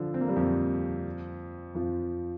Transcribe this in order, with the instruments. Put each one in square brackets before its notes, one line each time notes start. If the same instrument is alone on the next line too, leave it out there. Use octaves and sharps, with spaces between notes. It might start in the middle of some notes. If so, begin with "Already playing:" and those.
Already playing: [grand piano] D3 F3
C4
A#3
G3
F2 F3
F2 F3